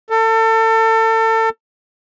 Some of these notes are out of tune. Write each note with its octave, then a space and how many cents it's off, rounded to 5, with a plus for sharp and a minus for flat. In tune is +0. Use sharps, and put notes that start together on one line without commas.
A4 +30